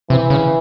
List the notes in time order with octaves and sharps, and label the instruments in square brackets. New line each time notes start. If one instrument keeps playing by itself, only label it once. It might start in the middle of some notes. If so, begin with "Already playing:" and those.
[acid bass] C3 [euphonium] E3
[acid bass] C#3